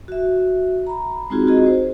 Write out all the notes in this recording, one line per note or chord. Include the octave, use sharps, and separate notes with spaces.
F#4 E5
A#5 B5
G#3 C4 D#4 F4 F#4 G#4
F4 F#4 G#4 D#5
C5